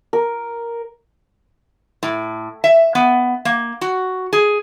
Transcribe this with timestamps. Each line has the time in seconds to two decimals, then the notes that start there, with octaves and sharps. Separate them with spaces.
0.13 A#4
2.03 A2
2.64 E5
2.95 B3
3.45 A#3
3.81 F#4
4.33 G#4